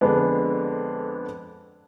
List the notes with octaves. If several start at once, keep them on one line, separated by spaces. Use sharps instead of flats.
F2 D3 G#3 B3 D4